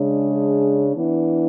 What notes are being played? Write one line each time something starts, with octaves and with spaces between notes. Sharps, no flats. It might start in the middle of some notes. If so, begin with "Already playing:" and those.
Already playing: C#3 G#3 D4 G#4
E3 B3 D4